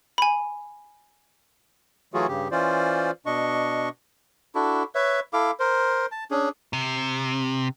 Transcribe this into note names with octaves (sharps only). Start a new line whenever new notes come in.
G#5 B5
E3 F#3 A3 F4 F#4 G#4
G2 C#3 G4
E3 C#4 F4 C5 D5
B2 D4 D#5 C#6
D4 E4 F#4 A4
B4 C#5 E5
E4 A4 F5 D6
A#4 C5
A5
C#4 D4 G#4
C3